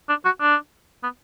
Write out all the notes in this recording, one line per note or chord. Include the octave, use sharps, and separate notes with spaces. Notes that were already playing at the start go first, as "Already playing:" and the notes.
D4
F#4
D4
B3